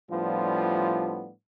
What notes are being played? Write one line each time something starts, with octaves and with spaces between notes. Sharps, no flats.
A2 F3 G3 B3 D4 F4